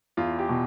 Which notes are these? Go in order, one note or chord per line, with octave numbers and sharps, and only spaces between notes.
E2 F4
G4
B2